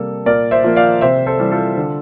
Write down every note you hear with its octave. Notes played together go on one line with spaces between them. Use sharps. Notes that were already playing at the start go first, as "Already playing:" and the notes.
Already playing: C3 G3 A#3 A4
A#2 A#4 D5
C5 E5
F3 A#3
D5 F5
C3 C5 E5
A4 C5
E3 G3
F4 A4
D3